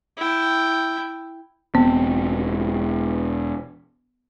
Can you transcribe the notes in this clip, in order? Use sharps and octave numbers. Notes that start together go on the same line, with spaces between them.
E4 G5
E1 B3 C4